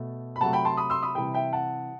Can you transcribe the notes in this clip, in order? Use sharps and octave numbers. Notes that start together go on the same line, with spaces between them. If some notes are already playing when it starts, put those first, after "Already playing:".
Already playing: B2 A3
B5
C3 F#3 A3 F#5 A5
G5 B5
A5 C6
B5 D#6
C6 E6
B5 D#6
C3 E3 G3 G5 B5
E5 G5
F#5 A5